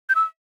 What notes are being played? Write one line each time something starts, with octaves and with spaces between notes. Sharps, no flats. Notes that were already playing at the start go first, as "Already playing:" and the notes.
G6
E6